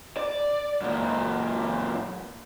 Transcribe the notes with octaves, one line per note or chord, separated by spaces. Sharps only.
D5
F#2 A#2